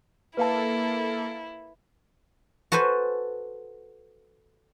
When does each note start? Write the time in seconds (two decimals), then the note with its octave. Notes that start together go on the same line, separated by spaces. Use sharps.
0.37 A#3 E4 A4 B4 F5 A5
2.72 F#4 A4 B4 C5 G#5